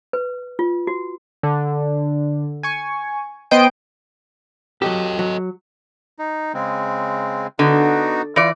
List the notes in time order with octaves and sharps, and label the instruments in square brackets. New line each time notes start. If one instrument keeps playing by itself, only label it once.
[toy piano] B4
F4
F#4
[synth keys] D3
G#5 C#6
B3 C5 D#5 G5 D7
[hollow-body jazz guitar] F#3 G4 [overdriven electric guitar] A4 D#5
[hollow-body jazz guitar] F#3
[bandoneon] D#4
C#3 G#3 C4
[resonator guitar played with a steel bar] D3 [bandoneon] B3 D#4 F#4
[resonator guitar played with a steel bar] E3 D5 [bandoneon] F4